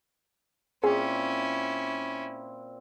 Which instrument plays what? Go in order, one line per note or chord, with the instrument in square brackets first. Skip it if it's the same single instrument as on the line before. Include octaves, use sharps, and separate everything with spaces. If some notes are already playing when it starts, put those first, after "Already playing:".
[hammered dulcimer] A#2 C4 [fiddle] C#4 E4 [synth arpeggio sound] G#4